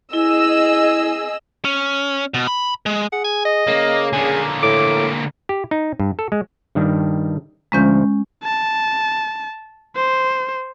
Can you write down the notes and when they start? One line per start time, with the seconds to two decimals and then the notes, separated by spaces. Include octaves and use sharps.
0.13 E4 G#4 D#5 E6
1.65 C#4
2.34 B2
2.47 B5
2.86 G#3
3.12 G#4 F#5
3.24 G#5
3.45 D#5
3.67 C#3 A#3
4.13 D3 A#3 G#4
4.63 A2 D6
5.49 G4
5.71 D#4
6.00 G2
6.19 A4
6.32 G#3
6.75 G2 D#3 G3
7.72 D2 F3 G#3 C#4 A#5 G6
8.43 A5
9.96 C5